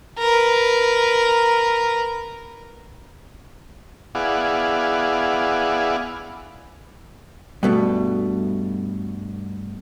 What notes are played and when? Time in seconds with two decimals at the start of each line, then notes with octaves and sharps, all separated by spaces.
0.18 A#4 B4
4.15 B3 E4 G#4 D5 F5 F#5
7.63 G2 B2 A3